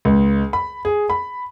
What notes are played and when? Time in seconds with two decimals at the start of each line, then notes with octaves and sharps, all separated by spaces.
0.05 C#2
0.53 B5
0.85 G#4
1.10 B5